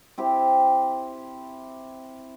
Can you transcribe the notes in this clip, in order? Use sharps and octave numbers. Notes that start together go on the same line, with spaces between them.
C4 E4 G4